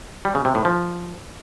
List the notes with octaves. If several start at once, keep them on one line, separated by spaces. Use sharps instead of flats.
G3
C#3
C3
A2
F3